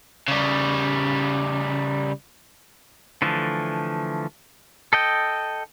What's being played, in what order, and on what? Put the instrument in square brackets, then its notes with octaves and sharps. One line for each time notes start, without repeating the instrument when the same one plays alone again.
[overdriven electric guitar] C#3 G3
[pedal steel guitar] D3 E3 F3 A3
A4 D#5 G5